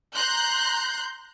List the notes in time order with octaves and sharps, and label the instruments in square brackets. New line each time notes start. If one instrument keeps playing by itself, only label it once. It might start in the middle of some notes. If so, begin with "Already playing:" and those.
[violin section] A#5 C6 F#6 G6